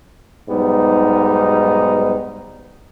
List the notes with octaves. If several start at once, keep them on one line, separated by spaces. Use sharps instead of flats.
B1 G#2 G3 B3 D#4